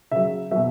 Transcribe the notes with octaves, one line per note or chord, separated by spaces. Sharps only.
C#3 F#3 E5
B2 F#3 E5